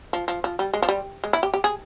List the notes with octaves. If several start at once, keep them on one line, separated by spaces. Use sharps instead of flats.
F3
F3
F3
G3
G#3
F3
G3
G#3
E4
G4
G4
G#4